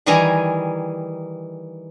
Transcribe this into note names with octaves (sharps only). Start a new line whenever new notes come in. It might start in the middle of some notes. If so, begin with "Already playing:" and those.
D#3 E3 G3 G#4 G#5 A#5